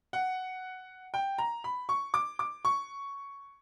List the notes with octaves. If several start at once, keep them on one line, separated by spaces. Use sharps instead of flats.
F#5
G5
A#5
B5
C#6
D6
D6
C#6